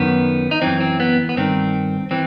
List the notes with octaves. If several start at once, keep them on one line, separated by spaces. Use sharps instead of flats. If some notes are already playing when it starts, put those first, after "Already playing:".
Already playing: F#2 D#3 B3
D#4
F#2 E3 C4
C4
B3
B3
G2 D#3 C4
E3 C4